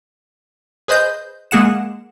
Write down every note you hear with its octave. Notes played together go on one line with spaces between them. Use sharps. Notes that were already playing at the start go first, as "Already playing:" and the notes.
G#4 B4 C5 D#5 G6
G#3 A#3 G#4 F#5 E7